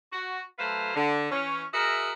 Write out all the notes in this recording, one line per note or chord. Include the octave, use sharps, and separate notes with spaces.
F#4
F#3 A3 A4 B4 C5 F5
D3
E3 C#4
F#4 G#4 A#4 D#5 E5